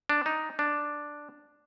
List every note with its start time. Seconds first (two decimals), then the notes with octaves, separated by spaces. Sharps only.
0.09 D4
0.26 D#4
0.59 D4